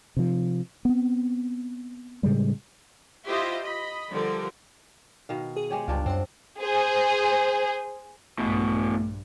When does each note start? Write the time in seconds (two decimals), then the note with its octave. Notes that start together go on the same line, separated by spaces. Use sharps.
0.17 C3 F3
0.85 B3 C4
2.23 A2 C#3 G3 G#3
3.27 E4 F4 G4 C5 D#5 E5
3.61 D#5 B5
4.10 D3 F3 G3 A#4 D5
5.29 B2 D#3 F5
5.56 G#4
5.70 G#3 G4 C#5
5.88 C#2 G2 D4 F4
6.06 F#2 C4 F#5
6.60 G#4 C5
8.39 A#1 G2 B2 E3 A3